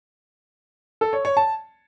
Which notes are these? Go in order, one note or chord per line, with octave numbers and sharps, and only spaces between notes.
A4
C#5
C#5
A5